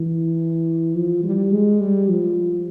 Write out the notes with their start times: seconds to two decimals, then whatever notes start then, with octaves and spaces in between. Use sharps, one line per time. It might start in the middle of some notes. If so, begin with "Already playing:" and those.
Already playing: E3
0.96 F3
1.24 G3
1.52 G#3
1.81 G3
2.09 F3